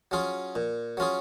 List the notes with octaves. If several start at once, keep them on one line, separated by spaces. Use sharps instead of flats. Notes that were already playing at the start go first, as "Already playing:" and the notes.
F#3 C#4 F4 G#4
A#2
F#3 C#4 F4 G#4